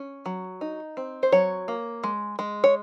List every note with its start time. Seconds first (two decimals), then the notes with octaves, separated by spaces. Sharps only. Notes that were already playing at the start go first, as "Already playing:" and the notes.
Already playing: C#4
0.26 F#3
0.61 D#4
0.97 C4
1.23 C5
1.32 F#3 C#5
1.68 A#3
2.04 G#3
2.39 G#3
2.64 C#5